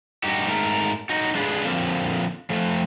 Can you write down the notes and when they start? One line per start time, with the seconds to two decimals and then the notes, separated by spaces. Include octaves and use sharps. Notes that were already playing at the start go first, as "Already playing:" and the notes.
0.23 G2 D#4 F#4 G4
0.47 G#2 A3 A#4
1.09 D#4 F#4
1.34 D3 G#3 D4 F4 G#4 B4
1.65 D3 F3 A#3 C4
2.50 F3 A3